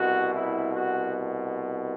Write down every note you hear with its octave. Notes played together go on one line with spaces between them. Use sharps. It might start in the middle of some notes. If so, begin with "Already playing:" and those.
Already playing: C2 B2 F#4
E4
F#4